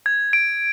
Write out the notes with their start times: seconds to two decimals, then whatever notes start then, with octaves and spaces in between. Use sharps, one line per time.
0.06 G#6
0.33 D7